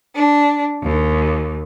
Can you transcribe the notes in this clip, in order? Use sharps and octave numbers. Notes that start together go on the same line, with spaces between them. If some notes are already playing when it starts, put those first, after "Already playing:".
D4
D#2